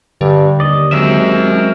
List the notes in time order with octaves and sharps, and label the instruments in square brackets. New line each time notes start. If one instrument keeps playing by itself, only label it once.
[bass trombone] G2 [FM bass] D3
[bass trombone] D#2 [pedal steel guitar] D5 D#5
[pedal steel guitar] F#3 G#3 C4 [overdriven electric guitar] A#4 E5